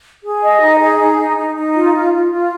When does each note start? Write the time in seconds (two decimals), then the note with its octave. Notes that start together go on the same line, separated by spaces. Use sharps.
0.23 G#4
0.42 D#5
0.61 D#4
0.80 G#4
0.99 D#4
1.18 D#4
1.37 D#4
1.55 D#4
1.75 F4
1.93 F4
2.12 F4
2.31 F4